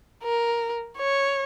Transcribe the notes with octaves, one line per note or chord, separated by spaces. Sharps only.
A#4
C#5